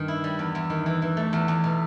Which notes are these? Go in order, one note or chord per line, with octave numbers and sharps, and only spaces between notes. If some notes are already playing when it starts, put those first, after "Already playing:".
Already playing: G2 D#3
E4
G3
E2
E2
D#3
E3
E3
A3
E2
E2
B2